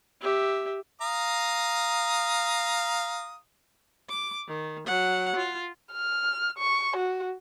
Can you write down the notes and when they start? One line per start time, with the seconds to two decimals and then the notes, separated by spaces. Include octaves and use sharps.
0.22 G4 E5
1.01 F5 A#5 D#6
4.09 D6
4.48 D#3
4.87 F#3 F#5
5.36 F4
5.92 F6
6.58 C#6
6.97 F#4